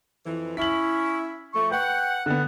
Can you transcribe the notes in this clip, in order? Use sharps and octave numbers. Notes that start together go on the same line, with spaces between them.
F2 E3
C#4 E4 B6 F#7
F3 A3 C#6
B4 F#5 G5
D3 B3 F#5